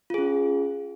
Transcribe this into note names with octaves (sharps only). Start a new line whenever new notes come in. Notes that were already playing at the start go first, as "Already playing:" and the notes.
C#4 F4 G#4